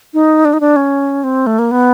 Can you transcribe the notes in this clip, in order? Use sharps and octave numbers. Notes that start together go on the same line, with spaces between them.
D#4
D4
D#4
D4
C#4
C4
A3
A#3
B3